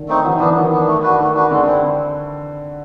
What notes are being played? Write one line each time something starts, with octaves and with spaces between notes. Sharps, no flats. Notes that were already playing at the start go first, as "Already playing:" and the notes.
Already playing: D3 D#3
A3 C4 D#4
E3 F#3
E3 B3 D4
D#3 F#3
B3 D4
A3
D4 F#4 B4
D#3 A3
D4 F#4 B4
D3 G#3
C4 E4